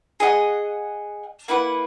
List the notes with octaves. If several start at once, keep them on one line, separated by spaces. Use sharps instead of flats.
G#4 D#5 F#5
A#3 E4 B4 F#5